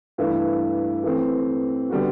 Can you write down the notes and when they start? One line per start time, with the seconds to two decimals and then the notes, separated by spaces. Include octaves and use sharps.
0.18 G2 E3 A3 E4
1.04 E3 A3 C4
1.90 D3 G3 B3 F#4